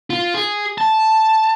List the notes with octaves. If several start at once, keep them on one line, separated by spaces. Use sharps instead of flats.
F4
G#4
A5